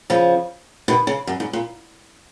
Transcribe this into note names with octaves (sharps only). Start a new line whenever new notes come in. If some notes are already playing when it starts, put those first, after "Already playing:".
C#3 F3
B2 D#3
C#3
F#2
G#2
A#2